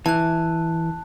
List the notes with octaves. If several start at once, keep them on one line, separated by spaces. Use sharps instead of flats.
E3 A5 F#6